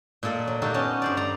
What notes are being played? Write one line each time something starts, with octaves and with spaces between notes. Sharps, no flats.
A#2 A#3 A4 D#5
F#3
A#3 D#4 F#4 G4 A4
B3 C#4 D#5 A5
G2 C5 D5
D5 A#5